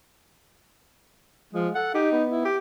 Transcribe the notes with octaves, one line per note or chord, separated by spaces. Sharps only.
F3 G#3
A4 F#5
D#4 G4
B3
E4
G4